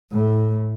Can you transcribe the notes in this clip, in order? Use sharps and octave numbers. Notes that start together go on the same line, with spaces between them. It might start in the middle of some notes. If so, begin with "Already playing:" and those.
A2